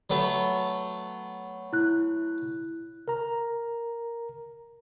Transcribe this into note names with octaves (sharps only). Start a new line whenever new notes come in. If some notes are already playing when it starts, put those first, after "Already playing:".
F#3 A3 B3
E4 F#6
A#4 A#5